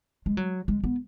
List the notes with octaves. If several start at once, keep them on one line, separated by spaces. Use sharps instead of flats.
G#3
F#3
G#3
B3